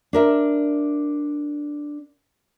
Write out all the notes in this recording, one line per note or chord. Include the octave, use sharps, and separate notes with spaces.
D4 A#4 E5